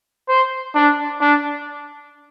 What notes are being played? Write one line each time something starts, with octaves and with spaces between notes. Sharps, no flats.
C5
D4
D4